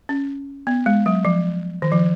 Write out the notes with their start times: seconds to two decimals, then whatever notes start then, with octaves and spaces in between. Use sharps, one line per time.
0.09 C#4
0.67 B3
0.86 G#3
1.06 F#3
1.25 F3
1.82 D#3
1.92 F3